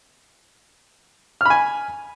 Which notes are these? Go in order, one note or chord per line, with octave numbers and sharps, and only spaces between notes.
G#5 B5 F6